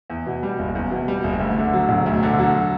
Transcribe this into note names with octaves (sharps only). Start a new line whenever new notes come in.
E2
B2
G3
F#1
E2
B2
G3
F#1
D2
D3
F#3
E1
D2
D3
F#3